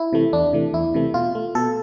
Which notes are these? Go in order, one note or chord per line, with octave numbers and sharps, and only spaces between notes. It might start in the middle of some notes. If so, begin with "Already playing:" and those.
Already playing: E4
C3 E3 A3
E2 D4
C3 E3 A3
E2 E4
C3 E3 A3
B2 F4
A3
B2 A4